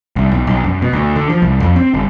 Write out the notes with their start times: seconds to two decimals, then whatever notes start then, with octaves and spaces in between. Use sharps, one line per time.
0.16 C2
0.31 B1
0.47 B1
0.64 F#2
0.82 B2
0.93 D2
1.16 D3
1.30 F3
1.42 C2
1.60 F2
1.76 C4
1.94 G1